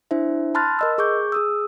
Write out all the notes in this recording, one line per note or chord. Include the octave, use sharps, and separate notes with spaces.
D4 E4 C5 E5
A5 B5 C6 F6 F#6 A6
A#4 D#5 E6
G#4 C#6 D6 G6
G#4 D#6 E6